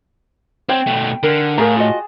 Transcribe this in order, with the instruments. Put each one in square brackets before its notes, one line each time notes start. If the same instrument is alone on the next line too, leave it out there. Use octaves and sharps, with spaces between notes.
[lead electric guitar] C4 [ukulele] C#5 [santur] G5
[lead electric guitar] B2 A3
[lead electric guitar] D3 [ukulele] A#4
[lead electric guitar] A2 [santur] G#4 A5 [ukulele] A#4 F5 A#5
[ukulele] F4 F#4 D#5